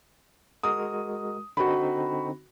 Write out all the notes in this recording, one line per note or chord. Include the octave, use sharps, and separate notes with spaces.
G#3 F#4 A#4 D#6
D3 C4 D#4 F#4 B5